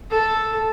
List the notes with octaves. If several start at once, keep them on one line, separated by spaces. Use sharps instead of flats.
A4